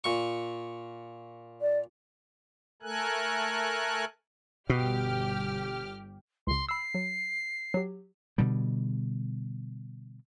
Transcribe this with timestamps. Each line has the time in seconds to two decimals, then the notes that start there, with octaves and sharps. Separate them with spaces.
0.04 A#2 C#6
1.61 D5
2.82 A3 A4 A#4 G#5 F#6
4.70 G1 B2 G4 F6
6.47 C#2 C#3 C6
6.69 B5 E6 C7
6.95 F#3
7.74 F#3 G4
8.38 B2 D3 G3